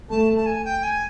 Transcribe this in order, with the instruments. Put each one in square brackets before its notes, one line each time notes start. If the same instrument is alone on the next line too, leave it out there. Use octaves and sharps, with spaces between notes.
[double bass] A3 [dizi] A5
[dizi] A5
G#5
G5
G#5